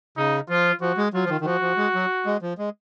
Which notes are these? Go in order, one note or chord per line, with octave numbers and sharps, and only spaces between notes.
C#3 D#4
F3 F4
F3 F#4
G#3
F#3 F4
F3
D#3
D#3
F3 F#4
F3
G#3
F#3
G#3
F3
G#3